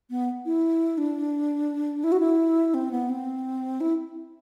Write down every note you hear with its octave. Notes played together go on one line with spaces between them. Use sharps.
B3
E4
D4
E4
F#4
E4
C4
B3
C4
E4